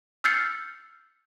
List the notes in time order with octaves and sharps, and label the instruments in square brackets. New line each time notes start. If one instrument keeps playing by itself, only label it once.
[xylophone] E6 F6 G6 A6 C7 C#7